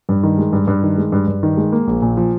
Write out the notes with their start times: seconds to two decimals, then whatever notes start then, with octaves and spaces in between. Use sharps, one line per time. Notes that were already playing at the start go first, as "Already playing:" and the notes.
0.09 G2
0.23 D#3
0.38 G#3
0.53 G2
0.68 G2
0.83 D#3
0.98 G#3
1.12 G2
1.27 G2
1.43 D#3
1.57 G#3
1.72 A#3
1.87 A#1
2.02 A#2
2.17 F3